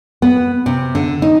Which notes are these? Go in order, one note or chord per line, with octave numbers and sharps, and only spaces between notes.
B3
C3
D3
D#4